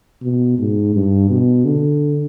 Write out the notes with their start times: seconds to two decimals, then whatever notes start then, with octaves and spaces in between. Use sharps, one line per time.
0.23 B2
0.58 G#2
0.94 G2
1.30 B2
1.65 D3